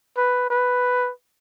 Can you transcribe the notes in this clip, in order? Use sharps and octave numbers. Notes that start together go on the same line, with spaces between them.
B4
B4